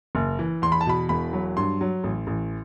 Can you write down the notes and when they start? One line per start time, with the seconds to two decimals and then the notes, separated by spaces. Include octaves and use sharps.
0.15 F#1
0.39 E3
0.62 E2 C6
0.72 B5
0.81 A5
0.87 B2 B5
1.09 E1 B5
1.33 F#3
1.57 G2 C6
1.81 F#3
2.04 A1
2.27 A1